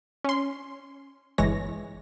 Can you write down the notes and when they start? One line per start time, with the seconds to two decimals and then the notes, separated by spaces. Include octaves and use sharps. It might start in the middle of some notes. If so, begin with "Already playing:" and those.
0.24 C#4 C6
1.38 G1 E3 G#3 C#5 A#6